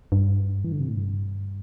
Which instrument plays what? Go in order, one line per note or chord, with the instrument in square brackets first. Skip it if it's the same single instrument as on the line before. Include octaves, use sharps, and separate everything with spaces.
[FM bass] G2
E3
D3
C3
A2
G2